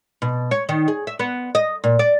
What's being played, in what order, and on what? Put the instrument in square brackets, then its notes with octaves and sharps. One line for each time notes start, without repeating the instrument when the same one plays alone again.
[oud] B2
C#5
D#3
G#4
E5
B3
D#5
A#2
D5